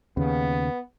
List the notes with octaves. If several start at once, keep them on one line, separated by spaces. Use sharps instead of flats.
D#2 C#3 B3